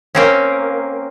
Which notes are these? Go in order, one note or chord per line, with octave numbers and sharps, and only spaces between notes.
A#3 C4 C#4